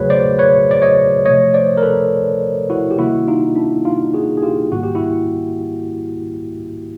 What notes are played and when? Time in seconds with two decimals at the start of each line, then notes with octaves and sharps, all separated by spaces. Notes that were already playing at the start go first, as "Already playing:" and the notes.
Already playing: E2 C#3 F#3 A3 F#4 G#4 B4 C#5
0.10 C5 D5
0.39 B4 C#5
0.71 D5
0.82 C#5 D#5
1.25 C3 F3 A3 C#5 D#5
1.54 C5 D5
1.77 A#4
1.83 A4 B4
2.70 E4 F#4
2.91 G4
2.98 C3 D#3 G3 A#3 E4 F#4
3.28 D#4 F4
3.56 D4 E4
3.85 D#4 F4
4.14 F#4 G#4
4.37 G#4
4.43 F4 G4
4.72 G#2 D#3 G3 A#3 F#4
4.83 G4
4.95 E4 F#4